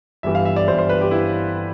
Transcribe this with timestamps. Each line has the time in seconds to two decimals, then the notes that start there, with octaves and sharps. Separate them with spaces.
0.23 G1 G2 E3 G3 E5
0.35 F5
0.45 E5
0.56 D5
0.68 G1 G2 E3 G3 C5
0.78 C5
0.89 B4
1.01 G4
1.11 E3 G3 E4